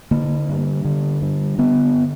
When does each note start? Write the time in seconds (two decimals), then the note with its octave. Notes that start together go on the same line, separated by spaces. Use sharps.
0.11 D3 A#3
0.49 G2
0.85 D3
1.22 G2
1.58 D3 B3